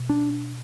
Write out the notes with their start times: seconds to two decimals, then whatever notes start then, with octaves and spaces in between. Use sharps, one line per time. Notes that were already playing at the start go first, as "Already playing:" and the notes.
Already playing: B2
0.09 D4